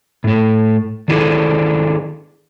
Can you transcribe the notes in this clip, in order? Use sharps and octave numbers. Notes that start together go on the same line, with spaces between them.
A2 A3
D#3 D4 E4 G#4 A4